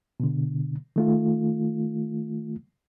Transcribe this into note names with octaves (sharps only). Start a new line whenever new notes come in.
B2 D3
D#3 A3 F4